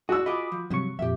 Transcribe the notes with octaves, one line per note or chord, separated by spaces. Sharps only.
F#4 G#4 D5 E6
F4 G#4 D#5 B5 D6 D#6
F3
G2 C3 F3 F#3 C#6
F2 A#2 G4 E5